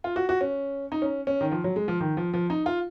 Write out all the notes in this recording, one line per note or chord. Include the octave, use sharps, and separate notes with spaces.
F4
F#4
F#4
C#4
D#4
C#4
C#4
D#3
F3
F#3
G#3
F3
D#3
F3
F3
D#4
F4